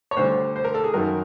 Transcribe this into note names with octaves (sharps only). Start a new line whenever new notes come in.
C#5
D2 D3 G3 C5
C5
A#4
A4
G#4
F#2 D#3 F#3 A#4